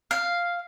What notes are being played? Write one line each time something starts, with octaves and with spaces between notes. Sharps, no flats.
F5